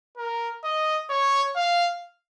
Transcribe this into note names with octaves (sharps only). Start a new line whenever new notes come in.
A#4
D#5
C#5
F5